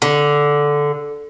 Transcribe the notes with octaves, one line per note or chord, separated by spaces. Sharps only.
D3